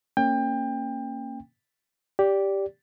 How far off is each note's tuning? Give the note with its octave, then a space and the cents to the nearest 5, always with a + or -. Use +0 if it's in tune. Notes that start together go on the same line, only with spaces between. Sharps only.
A#3 -10 C#4 -15 G5 +25
G4 +0 D5 -15